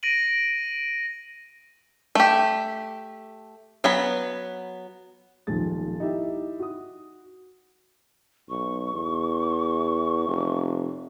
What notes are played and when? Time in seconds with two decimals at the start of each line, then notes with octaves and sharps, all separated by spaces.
0.03 A#6 D7 D#7 F#7
2.15 A3 G4
3.84 F#3 B3 B5
5.47 D#1 B1 F3 G#3 A6
6.00 D#4 E4 G4 E5
6.60 F#4 D#6
8.49 B1 C#6
8.94 E2
10.28 F1